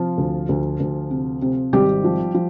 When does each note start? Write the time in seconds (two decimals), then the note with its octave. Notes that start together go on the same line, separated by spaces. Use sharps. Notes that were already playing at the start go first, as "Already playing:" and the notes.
Already playing: C3 F3 F4
0.18 D2
0.49 D2
0.80 D2
1.11 C3
1.42 C3
1.73 G#1 G3 G4
2.04 F3
2.34 F3